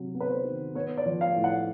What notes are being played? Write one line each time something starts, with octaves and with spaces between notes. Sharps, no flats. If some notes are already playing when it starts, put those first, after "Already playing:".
Already playing: C3 F#3
B3
B4
C5
D#3
B3 C#5
D5
F3
F5
A2
F#5